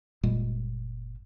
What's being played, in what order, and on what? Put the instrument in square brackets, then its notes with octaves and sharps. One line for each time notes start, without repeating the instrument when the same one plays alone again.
[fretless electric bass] F#1 A#2 G3 G#3